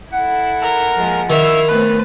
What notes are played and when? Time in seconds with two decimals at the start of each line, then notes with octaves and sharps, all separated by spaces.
0.13 E4 A4 F#5
0.62 A#4
0.95 F3 G#3 A#3
1.30 D#3 E4 E5 F5
1.69 A3 B3 C4 B4